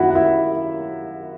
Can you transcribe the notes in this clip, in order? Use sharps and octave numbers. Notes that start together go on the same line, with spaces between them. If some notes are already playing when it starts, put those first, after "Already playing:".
Already playing: F#2 D#3 A#3 C#4 E4 F#4 E5 F#5
F#5
E4 E5